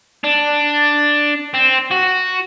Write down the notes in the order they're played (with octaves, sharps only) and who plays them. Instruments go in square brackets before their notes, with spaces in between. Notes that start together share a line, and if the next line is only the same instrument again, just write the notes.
[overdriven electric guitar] D4
C4
F#4